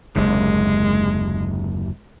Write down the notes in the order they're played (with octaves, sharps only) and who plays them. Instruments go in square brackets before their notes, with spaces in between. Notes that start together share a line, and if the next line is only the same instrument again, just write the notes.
[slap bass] F#1 D#2 C3 [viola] G#3